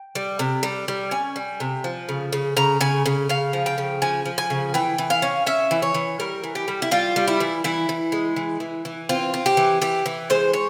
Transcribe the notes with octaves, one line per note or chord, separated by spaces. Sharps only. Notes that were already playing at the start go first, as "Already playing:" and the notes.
Already playing: G5
G3
C3
G3
G3
C#4 G#5
G3
C3
F3
C#3
C#3
C#3 A#5
C#3 G#5
C#3
C#3 F5
F3
G5
C#3
F3 G#5
F3
G#5
C#3
E3 G5
E3
F5
C#4
C#4 E5
E3
C#5
E3
G3 A#4
E3
G4
G3
E4
G3 F4
G3
E4
E3
E3 E4
E3
G#3
E3
E3
E3
C4 F4
C4
G4
E3
E3 G4
E3
G#3 C5
C#5